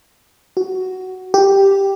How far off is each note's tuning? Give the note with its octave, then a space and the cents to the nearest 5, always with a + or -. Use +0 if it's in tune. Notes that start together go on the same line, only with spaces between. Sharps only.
F#4 +10
G4 +0